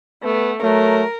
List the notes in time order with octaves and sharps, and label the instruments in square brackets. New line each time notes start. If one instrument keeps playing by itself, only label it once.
[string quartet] A3 [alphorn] B3
[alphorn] F#3 [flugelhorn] A3 [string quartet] A#4